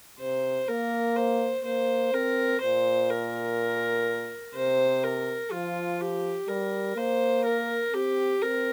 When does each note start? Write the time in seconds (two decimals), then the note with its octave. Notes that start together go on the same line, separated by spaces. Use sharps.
0.20 C3 C5
0.68 A#3 A#4
1.17 C5
1.65 A#3 C5
2.13 C4 A#4
2.62 A#2 C5
3.10 A#4
4.55 C3 C5
5.03 A#4
5.52 F3 F4
6.01 G4
6.48 G3 A#4
6.96 A#3 C5
7.45 A#4
7.93 C4 G4
8.42 C4 A#4